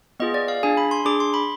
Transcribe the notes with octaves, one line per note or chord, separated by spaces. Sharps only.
B3 F4 G#4 D#5
D5
F5
D4 G#4 G#5
B5
C6
D4 G#4 D6
C6
B5